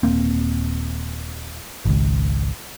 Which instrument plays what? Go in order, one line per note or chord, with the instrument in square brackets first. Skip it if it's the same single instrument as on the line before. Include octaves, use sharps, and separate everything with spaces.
[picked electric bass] D#1 A#3 C4
G#1 C#2